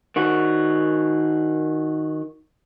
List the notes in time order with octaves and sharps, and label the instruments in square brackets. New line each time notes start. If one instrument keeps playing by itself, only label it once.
[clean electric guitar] D#3 F#4